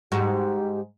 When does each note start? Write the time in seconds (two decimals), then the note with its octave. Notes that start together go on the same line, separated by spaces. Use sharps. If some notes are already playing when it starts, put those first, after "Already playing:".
0.12 G#2 F#4 G4